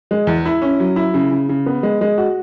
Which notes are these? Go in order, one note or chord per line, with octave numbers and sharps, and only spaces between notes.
G#3
E2
E4
C#4
F#3
E4
C#3
C#3
C#3
B3
G#3
G#3
F#4